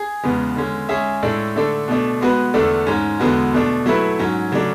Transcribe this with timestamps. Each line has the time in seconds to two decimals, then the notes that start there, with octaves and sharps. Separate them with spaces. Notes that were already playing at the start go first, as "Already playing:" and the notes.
Already playing: G#4
0.24 E2 C#3 G#3 B3
0.56 D3 G#3 C#4
0.89 G#3 C#4 G#4 C#5 E5
1.23 A2 G#3 D4 A4 D5
1.56 D3 A3 D4 A4
1.88 B2 A3 D4
2.21 G#3 B3 F#4 B4
2.54 E2 D3 A3 D4 A4
2.87 G#2 G#3 C#4
3.20 E2 D3 G#3 B3 F#4
3.53 B2 A3 D4
3.86 F#3 A3 E4 B4
4.19 G#2 F#3 C#4
4.52 C#3 F#3 A3 D4